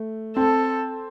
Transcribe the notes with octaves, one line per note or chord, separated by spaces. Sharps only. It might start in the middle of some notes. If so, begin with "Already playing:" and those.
Already playing: A3
C4 A4